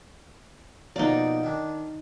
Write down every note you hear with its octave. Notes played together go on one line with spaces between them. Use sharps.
B2 F3 A#3 D#4 D5
D#3 D4